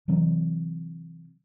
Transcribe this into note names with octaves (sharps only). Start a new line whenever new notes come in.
C3 E3 F#3 C4